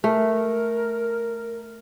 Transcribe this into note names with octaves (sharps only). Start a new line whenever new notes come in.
A3 A#4